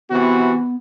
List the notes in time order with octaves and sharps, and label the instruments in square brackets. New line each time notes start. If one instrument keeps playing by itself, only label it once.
[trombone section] C3 E3 F#4 [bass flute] B3